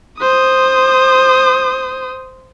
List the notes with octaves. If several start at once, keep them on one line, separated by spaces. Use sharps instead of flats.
C5 D#6